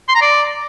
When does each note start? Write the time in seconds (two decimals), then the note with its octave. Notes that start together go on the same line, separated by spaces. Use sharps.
0.09 C6
0.15 A#5
0.22 D5